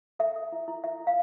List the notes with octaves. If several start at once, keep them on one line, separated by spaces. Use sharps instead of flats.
A4 E5
A4
E4
E4
E4 E5
E4
F5